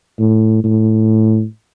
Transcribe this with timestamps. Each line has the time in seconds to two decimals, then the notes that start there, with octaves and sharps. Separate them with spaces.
0.19 A2
0.64 A2